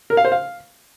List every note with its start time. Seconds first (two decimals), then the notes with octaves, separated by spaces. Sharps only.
0.10 A#4
0.17 F5
0.25 C5
0.32 F5